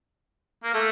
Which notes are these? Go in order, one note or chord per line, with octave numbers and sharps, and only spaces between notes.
A#3
A3